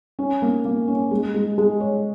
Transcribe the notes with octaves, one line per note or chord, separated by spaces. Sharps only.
C#4
A#3
A#3
C#4
G#3
G#3
G#3
C#5